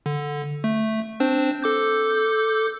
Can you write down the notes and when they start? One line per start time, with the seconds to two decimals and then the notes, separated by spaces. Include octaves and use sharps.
0.06 D3
0.64 A3
1.20 C4 D4 C5
1.62 A4 D6 G6